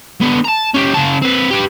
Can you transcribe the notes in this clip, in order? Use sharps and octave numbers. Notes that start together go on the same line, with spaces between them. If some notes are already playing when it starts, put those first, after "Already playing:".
D3 B3
A5 A#5
C#4 G4
C#3 A5
C4 B4
G4 B4